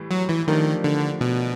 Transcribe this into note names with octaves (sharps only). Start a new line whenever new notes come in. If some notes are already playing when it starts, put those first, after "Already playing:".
Already playing: A2 E3 G3
F#3
E3
D#3 F3 A3 D4 G4 A#4
D3
B2